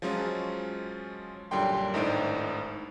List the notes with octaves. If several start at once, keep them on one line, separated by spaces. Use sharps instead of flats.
F3 F#3 G#3 C#4 F4
F#2 A#2 D3 G3 G5 C6
G#1 A2 D4 D#4 C5 D7